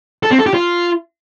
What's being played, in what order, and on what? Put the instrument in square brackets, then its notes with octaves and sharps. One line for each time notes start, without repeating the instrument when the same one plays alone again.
[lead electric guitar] A4
C4
A4
G4
F4